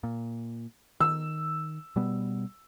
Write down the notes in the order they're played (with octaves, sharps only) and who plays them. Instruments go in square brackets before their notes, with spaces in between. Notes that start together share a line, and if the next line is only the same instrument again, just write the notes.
[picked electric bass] A#2
[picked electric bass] D#3 [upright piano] E6
[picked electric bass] B2 G3 B3